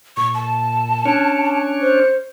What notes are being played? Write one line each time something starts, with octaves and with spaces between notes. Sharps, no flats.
A#2 C#6
A5
C#4 D4 C#5
C5